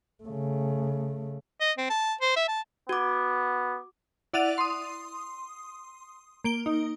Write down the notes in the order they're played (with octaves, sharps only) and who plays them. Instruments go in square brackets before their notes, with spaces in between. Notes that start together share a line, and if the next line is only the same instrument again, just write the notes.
[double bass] C#3 A3
[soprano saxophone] D#5
C4
A5
C5
E5
A5
[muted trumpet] B3 [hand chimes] F#4 D6
[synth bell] E4 D5 F#5 A6 D#7 F7
C6 D#6
A#3 D7 G7
D#4